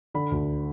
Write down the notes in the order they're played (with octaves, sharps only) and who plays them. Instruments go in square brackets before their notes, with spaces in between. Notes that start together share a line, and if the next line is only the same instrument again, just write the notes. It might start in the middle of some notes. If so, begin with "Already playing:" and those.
[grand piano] D3 B5
D2